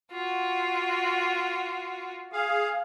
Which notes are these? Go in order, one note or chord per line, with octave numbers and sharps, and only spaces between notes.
F4 F#4
G#4 F5